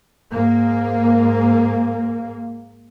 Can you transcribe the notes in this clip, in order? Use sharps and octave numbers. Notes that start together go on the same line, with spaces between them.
G#2 A#3